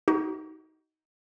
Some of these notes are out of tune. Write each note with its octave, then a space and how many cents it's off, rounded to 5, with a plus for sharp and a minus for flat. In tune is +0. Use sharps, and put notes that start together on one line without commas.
D#4 +20 F#4 +40